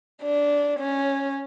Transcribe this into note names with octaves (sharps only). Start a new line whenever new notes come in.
D4
C#4